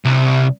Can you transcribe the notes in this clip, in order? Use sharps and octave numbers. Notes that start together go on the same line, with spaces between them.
C2